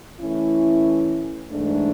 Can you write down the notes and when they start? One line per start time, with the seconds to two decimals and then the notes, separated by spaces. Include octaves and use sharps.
0.20 E3 A3 C#4 E4
1.51 G#2 E3 A3 D4